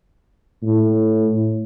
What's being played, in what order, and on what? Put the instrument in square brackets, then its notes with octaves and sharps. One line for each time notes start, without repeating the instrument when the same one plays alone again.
[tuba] A2